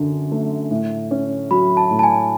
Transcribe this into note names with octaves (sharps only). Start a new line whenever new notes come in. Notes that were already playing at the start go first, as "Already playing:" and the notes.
Already playing: F#2 D3
A3
A2
C#4
F#3 B5
A5
A2
A5
G#5